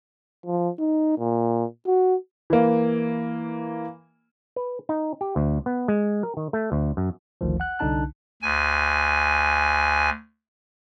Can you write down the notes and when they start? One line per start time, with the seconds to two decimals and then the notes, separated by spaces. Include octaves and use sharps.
0.46 F3
0.79 D#4
1.18 A#2
1.86 F#4
2.50 E3 A#3
4.56 B4
4.89 D#4
5.21 G4
5.36 D2
5.66 B3
5.88 G#3
6.23 A#4
6.37 D#3
6.53 A3
6.72 D2
6.97 F#2
7.41 G#1 D2 D#3 F3
7.60 F#5 F#6
7.79 C2 D3 D4 D#4 A5 F#6
8.42 D2 G#5